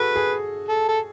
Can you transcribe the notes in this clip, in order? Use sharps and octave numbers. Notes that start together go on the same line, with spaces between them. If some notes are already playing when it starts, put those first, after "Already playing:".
Already playing: F#4 G#4 A4 B4
G#4
A4
A4